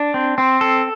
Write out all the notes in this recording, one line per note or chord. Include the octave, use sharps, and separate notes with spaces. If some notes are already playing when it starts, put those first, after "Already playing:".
Already playing: D4
C4
C4
A4